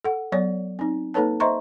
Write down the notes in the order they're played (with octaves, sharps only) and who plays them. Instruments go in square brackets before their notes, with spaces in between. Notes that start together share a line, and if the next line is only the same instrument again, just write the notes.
[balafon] A4 F#5
F#3 B3 C#5 D5
C4 D#4
A#3 D#4 A4 B4 C#5 A5
C5 D#5 E5 A#5 C6 C#6